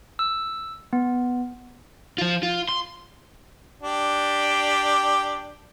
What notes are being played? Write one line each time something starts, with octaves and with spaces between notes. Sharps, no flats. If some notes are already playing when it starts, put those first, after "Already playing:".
E6
B3
F3 F4
F4
C6
D4 G4